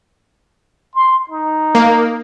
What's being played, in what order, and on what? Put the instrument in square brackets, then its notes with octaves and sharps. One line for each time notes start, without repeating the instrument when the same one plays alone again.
[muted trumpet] C6
D#4
[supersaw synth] A#3